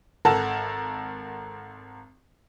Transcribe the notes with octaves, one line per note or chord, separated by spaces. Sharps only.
G#1 A4 A#4 F#5 A5 A#5